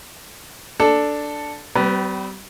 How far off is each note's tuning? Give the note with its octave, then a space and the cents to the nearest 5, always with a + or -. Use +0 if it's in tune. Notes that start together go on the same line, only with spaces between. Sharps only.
D4 +0 A4 +0
G3 -35 C4 -45 B4 +0